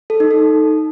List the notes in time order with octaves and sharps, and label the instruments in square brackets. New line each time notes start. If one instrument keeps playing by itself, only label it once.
[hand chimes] A4
D#4
A4